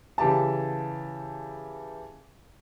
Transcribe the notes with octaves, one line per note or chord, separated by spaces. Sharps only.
C#3 E3 G4 A5